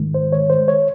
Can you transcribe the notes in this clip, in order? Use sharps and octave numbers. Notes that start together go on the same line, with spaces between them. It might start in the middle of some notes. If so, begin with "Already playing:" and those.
Already playing: G#2 D#3 G#3
C5
C#5
C5
C#5